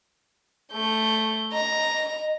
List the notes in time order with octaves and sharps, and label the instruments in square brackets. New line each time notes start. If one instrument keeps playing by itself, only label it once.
[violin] A3 G6
[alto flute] D#5 [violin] A#5